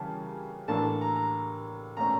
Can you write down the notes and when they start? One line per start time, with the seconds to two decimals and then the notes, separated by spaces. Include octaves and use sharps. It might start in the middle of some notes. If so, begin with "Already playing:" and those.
Already playing: C#3 E3 G3 A#3 C#4 G5 A5
0.68 A2 E3 A#3 D4 A4 A5
1.01 A#5
1.15 A#5
1.97 A#2 A3 C#4 A#5